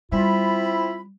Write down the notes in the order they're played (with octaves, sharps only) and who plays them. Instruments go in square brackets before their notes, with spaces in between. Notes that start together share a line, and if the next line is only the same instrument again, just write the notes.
[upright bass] G3 [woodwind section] C4 F4 B5 [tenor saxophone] E4